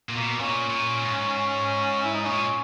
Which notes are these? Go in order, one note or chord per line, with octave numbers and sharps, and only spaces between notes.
A#2
B2 A#3
A#2 C#4
A#2
G#2
E4
D#4
A#2 C#4